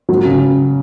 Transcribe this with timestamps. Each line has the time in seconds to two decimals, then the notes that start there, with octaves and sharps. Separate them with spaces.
0.09 F#3
0.25 C#3